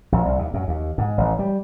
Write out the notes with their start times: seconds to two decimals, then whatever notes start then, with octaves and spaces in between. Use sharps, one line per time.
0.12 A#1
0.26 C2
0.39 D#2
0.54 F#2
0.68 D#2
0.98 G#2
1.18 A1
1.39 G3